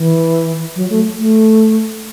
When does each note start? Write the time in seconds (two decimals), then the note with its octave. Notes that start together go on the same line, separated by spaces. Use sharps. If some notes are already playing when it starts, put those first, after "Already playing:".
Already playing: E3
0.76 F#3
0.90 A3
1.18 A3